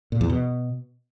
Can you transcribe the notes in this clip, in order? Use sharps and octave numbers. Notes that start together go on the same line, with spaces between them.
A#2
E2
B2